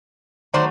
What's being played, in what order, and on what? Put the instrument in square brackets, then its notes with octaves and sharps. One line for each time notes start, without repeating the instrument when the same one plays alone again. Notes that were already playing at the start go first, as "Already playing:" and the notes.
[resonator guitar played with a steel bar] D#3 F#3 A3 C5 D5